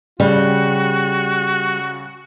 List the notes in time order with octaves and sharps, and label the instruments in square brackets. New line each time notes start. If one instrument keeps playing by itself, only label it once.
[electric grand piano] C#3 [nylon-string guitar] G3 [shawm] F#4